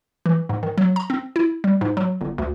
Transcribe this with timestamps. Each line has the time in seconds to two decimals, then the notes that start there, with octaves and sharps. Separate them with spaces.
0.26 E3
0.49 G#2
0.63 D#3
0.78 F#3
0.96 A#5
1.10 C4
1.36 E4
1.64 G3
1.81 G#2
1.97 F#3
2.21 G1
2.38 D2